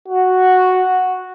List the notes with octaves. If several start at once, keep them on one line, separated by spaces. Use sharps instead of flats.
F#4